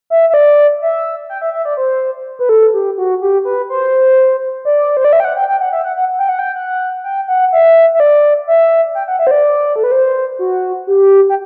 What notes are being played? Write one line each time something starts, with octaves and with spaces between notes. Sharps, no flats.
E5
E5
D5
E5
G5
E5
E5
D5
C5
B4
A4
G4
F#4
G4
B4
C5
D5
C5
D5
E5
G5
F#5
G5
G5
F#5
E5
F#5
F#5
G5
F#5
G5
F#5
G5
F#5
E5
E5
D5
E5
G5
F#5
E5
C5
D5
A4
B4
C5
F#4
G4
G5